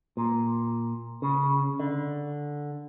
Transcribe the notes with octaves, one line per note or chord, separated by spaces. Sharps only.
A#2
C#3
D3